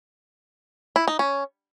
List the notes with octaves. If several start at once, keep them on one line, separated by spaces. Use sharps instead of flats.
E4
D#4
C#4